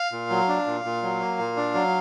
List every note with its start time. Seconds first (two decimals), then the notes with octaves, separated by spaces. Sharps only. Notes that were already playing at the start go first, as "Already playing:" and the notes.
Already playing: F5
0.12 A#2
0.30 F#3
0.48 D4
0.66 A#2
0.85 A#2
1.03 F#3
1.20 A#3
1.39 A#2
1.56 D4
1.74 F#3